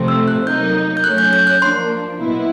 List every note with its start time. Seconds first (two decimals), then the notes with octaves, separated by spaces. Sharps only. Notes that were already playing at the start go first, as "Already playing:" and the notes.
Already playing: C3 F3 A3 C4
0.08 E6
0.28 F#6
0.46 F#3 A#3 D#4 G6
0.97 G6
1.04 F#3 A3 C#4 F#6
1.18 G6
1.33 G6
1.47 F#6
1.61 F3 A#3 D4 C6
2.19 B2 F#3 B3 E4